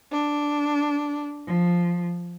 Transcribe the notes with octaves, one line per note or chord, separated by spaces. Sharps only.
D4
F3